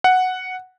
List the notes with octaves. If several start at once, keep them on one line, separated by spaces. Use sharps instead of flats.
F#5